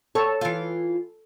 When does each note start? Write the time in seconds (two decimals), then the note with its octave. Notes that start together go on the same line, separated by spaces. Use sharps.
0.15 A4 C#5
0.41 E3 F4